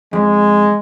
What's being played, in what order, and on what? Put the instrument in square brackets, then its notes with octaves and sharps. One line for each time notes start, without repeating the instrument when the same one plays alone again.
[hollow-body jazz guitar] F2 [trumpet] G#3